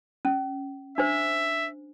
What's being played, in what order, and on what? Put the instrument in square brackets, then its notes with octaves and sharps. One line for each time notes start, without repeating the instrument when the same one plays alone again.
[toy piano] C#4
[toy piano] D4 C5 [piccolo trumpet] E5